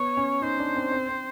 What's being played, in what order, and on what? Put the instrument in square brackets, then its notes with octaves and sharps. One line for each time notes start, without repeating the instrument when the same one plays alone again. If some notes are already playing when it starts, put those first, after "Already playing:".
Already playing: [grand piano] B3 [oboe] C#5
[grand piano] C#4
[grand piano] D#4 [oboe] C5
[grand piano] D4
C4
C4
C4